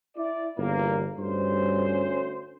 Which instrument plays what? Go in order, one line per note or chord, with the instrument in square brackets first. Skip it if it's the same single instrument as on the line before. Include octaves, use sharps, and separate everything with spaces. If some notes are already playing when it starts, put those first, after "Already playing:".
[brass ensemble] E4 D5
[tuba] G1 [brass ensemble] E2 A#2 A#3
[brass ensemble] D2 C#4 C5 [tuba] G2